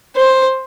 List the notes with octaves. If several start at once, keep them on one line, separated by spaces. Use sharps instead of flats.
C5